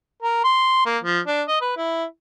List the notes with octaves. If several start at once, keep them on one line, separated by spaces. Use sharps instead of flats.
A#4
C6
A#3
F3
D4
D#5
B4
E4